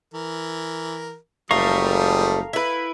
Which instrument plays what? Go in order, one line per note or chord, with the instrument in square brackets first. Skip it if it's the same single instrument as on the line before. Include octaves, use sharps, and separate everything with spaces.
[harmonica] E3 A#4
[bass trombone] F#1 [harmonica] F3 G3 D#6 [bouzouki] A3 [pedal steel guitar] A#4 F5 C#6
[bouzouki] E4 B4